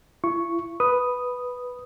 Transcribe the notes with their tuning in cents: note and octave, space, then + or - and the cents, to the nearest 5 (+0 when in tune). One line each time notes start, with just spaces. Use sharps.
E4 +45 C#6 +0
B4 +0 D#6 -5